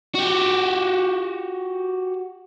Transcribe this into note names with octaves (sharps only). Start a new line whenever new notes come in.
F#4 G4